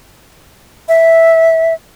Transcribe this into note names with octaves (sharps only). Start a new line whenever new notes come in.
E5